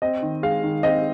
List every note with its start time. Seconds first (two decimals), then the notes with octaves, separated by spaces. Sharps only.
0.02 C4 D#5
0.22 D#3
0.43 G#3 F5
0.63 D#3
0.83 C4 D#5